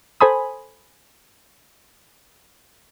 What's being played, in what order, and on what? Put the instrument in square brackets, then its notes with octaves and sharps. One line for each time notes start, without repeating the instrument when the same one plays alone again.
[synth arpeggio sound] A4 C5 G#5 B5 D#6